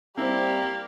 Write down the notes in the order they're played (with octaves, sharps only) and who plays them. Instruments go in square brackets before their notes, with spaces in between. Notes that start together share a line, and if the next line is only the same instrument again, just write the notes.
[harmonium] G3 [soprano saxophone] A#3 [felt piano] C4 E4 C5 [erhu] G4